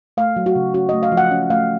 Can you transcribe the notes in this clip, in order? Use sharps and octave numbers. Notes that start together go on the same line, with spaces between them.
A3 F5
F#3
F#4
C#3
C#4 F#4
A3 D#5
F5
F3
F#5
C#4
A3 F5